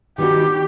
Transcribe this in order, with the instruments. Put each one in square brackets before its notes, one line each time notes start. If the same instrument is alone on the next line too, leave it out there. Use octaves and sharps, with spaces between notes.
[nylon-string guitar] D#3 G3 B3 D4 F#4 [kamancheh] G4